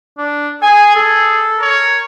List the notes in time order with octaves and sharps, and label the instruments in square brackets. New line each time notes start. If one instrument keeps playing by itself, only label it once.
[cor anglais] D4
[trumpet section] G#4 [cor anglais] G#5
[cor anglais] A4
[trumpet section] A#4 C#5